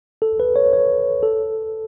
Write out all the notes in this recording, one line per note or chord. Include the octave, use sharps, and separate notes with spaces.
A4
B4
C#5
C#5
A4